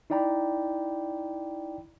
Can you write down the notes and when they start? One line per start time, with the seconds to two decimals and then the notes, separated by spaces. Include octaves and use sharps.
0.10 D#4 E4 D5 G5 A#5 B5